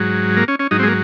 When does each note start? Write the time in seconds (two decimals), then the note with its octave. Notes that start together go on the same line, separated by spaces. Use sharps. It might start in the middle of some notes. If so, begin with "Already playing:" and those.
Already playing: G#2 F#3
0.37 A#3
0.48 C#4
0.59 C#4
0.71 G#2 F#3 D#4
0.79 C4
0.83 G#3
0.87 A#3